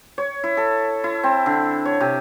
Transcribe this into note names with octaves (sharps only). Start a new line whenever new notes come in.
C#5
E4
A4
E4
C4
D3
C#5
C3